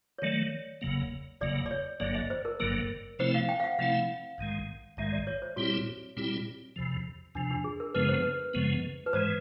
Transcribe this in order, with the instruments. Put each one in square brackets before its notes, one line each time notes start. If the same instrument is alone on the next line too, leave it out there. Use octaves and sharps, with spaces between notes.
[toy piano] C#5
[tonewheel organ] D#3 F#3 A3 [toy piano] D5
[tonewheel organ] F#1 E2 C#3 F#3 A#3
[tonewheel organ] F#1 E2 C#3 F#3 A#3 [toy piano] D5
[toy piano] D5
C#5
[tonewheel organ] G1 G2 D3 F#3 A#3 [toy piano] D5
[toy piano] D#5
C5
A#4
[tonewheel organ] G1 G2 D3 F#3 A#3 [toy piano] A#4
[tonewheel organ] C3 F3 A3 C4 E4 [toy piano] C5
[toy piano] F5
G5
F5
F#5
[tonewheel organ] C3 F3 A3 C4 E4 [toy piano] F5
[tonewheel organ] A#1 G#2 D#3 G#3
[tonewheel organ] A#1 G#2 D#3 G#3 [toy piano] E5
[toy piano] D5
C#5
C5
[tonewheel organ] A#2 G3 C4 E4 G4 [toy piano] F#4
[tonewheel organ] A#2 G3 C4 E4 G4
E2 C3 F3
[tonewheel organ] E2 C3 F3 [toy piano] D4
[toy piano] D4
G#4
A#4
[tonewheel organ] F#2 C#3 F3 G#3 B3 [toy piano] B4
[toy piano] C5
B4
[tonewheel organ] F#2 C#3 F3 G#3 B3
[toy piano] B4
[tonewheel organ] G#2 E3 G#3 [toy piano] C5